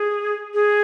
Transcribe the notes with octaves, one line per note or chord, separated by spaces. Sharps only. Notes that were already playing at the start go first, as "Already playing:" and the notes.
Already playing: G#4
G#4